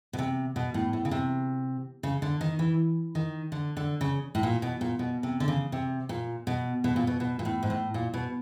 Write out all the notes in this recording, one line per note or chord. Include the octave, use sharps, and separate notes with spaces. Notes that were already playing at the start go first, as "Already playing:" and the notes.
B2
C3
B2
A2
A2
C#3
C3
C#3
D3
D#3
E3
D#3
D3
D3
C#3
A2
A#2
B2
A#2
B2
C3
D3
C#3
C3
A#2
B2
B2
A#2
B2
B2
A#2
A2
G#2
A2
A#2
B2